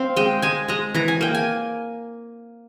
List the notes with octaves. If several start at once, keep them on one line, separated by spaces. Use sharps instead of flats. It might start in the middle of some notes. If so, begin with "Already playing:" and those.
Already playing: C4 F5
G#3 G5
G#3 G#5
G#3 A#5
E3 A#5
G#5
A#3 G5
G#5